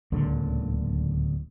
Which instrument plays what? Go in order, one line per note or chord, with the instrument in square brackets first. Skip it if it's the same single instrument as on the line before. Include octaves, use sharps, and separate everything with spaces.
[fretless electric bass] D1 C#2 A#2 D3